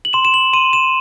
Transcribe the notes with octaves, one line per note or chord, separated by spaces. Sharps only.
F#7
C6 E7
E7
F#7
C6 D#7
E7